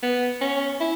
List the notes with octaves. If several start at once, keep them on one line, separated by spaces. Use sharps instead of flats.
B3
C#4
E4